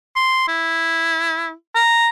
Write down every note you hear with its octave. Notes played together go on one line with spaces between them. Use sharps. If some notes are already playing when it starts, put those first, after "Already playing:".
C6
E4
A#5